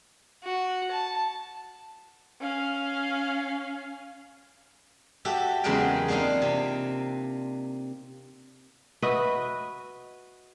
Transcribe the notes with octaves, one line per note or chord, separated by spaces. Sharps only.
F#4
A5
C#4 F5
F#4 G4 A4 E5
E2 C#3 F#3 G#3 A#4 G5
A#3 C4 D4 D#4 F4
C3
F#4 B4 D#5 E5